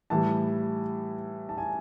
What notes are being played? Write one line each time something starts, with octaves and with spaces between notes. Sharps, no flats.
A2 E3 G3 A5
A5
G#5